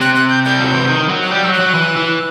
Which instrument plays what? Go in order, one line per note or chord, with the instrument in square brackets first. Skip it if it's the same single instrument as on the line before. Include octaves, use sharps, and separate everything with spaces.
[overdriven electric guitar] C3 [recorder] F#6
[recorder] F#6
G6
[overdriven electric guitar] G3 [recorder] G6
[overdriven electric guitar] F#3
E3
D#3
F#3
[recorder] F#6
[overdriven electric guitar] G3 [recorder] G6
[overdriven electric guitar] F#3 [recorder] E6
[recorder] F#6
[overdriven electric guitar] F#3
E3
E3